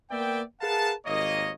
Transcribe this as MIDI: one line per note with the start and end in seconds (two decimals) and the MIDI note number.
0.11 0.41 58
0.11 0.41 59
0.11 0.41 74
0.11 0.41 76
0.11 0.41 79
0.61 0.92 68
0.61 0.92 70
0.61 0.92 71
0.61 0.92 77
0.61 0.92 78
0.61 0.92 81
1.06 1.51 32
1.06 1.51 39
1.06 1.51 55
1.06 1.51 58
1.06 1.51 73
1.06 1.51 75